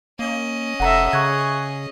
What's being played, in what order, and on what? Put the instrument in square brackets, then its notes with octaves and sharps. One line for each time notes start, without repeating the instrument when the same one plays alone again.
[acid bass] A#3 [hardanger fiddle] C#4 D#5
[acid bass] F1 [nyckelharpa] A4 E5 [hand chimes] F#5 A#5 A#6
[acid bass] C#3 [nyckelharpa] G#4 [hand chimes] C#6 F#6 G#6